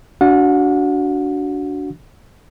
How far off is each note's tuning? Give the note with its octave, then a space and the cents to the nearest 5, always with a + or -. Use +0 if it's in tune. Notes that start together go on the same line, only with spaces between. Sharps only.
D4 -20 F#4 +5 F#5 -35